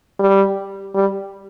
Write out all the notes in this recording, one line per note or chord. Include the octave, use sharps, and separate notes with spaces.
G3
G3